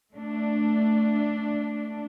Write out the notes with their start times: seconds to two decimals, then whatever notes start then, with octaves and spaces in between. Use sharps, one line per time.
0.13 A3 D4